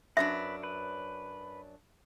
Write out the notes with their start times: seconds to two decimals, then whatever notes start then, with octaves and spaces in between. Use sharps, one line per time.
0.17 F#2 F#3 D4 B4 E5
0.63 B4